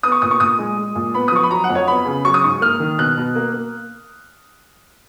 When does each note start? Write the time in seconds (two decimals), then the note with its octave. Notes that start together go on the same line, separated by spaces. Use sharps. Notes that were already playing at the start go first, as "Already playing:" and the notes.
0.03 B3 D#6
0.12 C#6
0.22 A#2 D#6
0.31 C#6
0.40 A#2 D#6
0.59 G#3
0.77 G#3
0.95 A#2
1.14 B3 B5
1.28 D#6
1.32 F3 C#6
1.43 B5
1.51 F#3 A#5
1.64 F#5
1.69 F2
1.75 C#5
1.88 B3 B5
2.06 C#3
2.25 F#3 C#6
2.34 D#6
2.44 G#2 C#6
2.61 A#3 F6
2.80 D#3
2.98 B2 F#6
3.17 B2
3.35 A#3
3.53 A#3